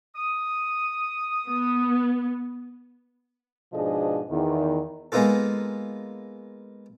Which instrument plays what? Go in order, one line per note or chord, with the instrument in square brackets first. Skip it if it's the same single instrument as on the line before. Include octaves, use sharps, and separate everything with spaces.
[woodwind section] D#6
[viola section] B3
[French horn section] G#2 B2 F3 D4 G#4 D#5
E2 D#3
[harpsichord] G#3 A#3 B3 D#4 F4 A4